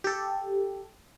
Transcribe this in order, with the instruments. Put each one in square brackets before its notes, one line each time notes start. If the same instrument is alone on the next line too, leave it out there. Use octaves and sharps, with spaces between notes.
[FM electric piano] G4 A4